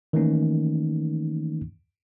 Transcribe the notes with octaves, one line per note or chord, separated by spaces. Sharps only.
D#3 E3 A3 A#3 C#4 D#4